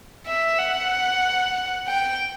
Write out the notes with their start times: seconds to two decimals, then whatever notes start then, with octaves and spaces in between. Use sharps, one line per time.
0.26 E5
0.58 F#5
1.87 G5